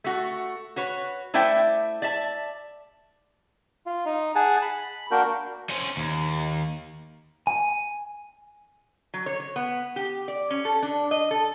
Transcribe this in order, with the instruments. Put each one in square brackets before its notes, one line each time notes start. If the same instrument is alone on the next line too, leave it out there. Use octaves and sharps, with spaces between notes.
[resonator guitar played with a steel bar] A3 F#4
F#4 B4 C#5
A3 E4 C5 D5 E5 G5
D5 E5 A5
[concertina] F4
D#4
G#4 F#5 G#5 A5
B5
A#3 D4 F#4 A#4 G5
[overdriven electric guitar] C#4 C5
D#2
[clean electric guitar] G#5
[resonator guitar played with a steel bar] F#3
C#5
C#5
B3
G4
D5
C#4
A4
D4
D#5
A4